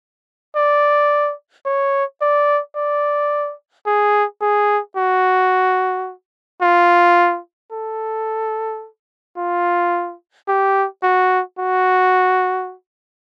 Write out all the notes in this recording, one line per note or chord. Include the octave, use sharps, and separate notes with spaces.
D5
C#5
D5
D5
G#4
G#4
F#4
F4
A4
F4
G4
F#4
F#4